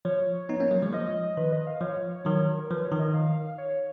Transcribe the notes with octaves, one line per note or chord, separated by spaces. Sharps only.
F3 C#5
B3 D#4
A#3 C#4
F#3 A#3
F3 G#3 C#5
F3 D#5
D#3 B4
D#5
F5
F3 C#5
D#3 F#3
A#4
F3 B4
C#5
D#3
D#5
F5
C#5